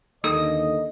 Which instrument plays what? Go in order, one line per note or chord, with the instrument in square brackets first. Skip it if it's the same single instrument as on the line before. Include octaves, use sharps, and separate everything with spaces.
[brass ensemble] D#2 D3 [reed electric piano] A#3 D#4 A4 [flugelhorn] D#5 [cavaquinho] D#6